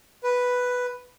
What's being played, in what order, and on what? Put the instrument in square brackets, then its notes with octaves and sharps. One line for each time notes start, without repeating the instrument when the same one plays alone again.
[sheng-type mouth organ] B4